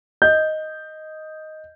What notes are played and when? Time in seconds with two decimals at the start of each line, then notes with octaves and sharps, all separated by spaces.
0.22 D#5 G6